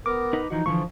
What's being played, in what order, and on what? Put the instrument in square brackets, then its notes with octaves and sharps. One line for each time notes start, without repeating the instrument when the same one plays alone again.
[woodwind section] B3 A#4 [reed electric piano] D6
[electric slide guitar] D#4 B4
[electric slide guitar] E3 F3 F#4 [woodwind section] D#4
[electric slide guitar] D3 E3 G#3 [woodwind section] F3 [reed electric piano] C#6